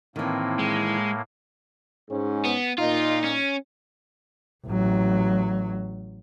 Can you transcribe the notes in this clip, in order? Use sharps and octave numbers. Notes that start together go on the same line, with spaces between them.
A2 D#3 E3 A#3 C4
G#3
G#2 C#4
B3
A#2 D#4 F4
C#4
A1 F#3